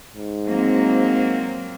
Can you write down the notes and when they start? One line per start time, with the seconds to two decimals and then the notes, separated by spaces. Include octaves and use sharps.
0.14 G#2
0.49 F#3 A#3 C4